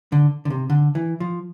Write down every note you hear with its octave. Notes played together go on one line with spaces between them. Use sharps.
D3
D3
C3
D3
E3
F3